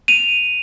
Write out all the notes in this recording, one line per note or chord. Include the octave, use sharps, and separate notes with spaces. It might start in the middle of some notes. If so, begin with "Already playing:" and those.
D#7 F7